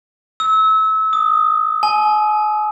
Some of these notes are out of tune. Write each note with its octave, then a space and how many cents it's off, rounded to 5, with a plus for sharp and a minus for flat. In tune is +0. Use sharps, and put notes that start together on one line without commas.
E6 -30
D#6 -5
G#5 +40